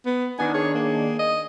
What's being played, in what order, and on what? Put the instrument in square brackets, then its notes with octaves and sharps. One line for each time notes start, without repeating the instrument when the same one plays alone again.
[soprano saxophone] B3
[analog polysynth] D#3 D4 [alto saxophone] B3 [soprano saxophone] G#5
[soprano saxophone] G#4 [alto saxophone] C#5
[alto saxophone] A#3
D#5